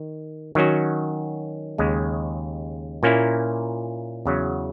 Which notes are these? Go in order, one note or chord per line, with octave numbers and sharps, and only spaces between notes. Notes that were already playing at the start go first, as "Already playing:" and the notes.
Already playing: D#3
D#3 F#3 C#4 F#4
D#2 C#3 G#3
A#2 A#3 C#4 E4
E2 C#3 F#3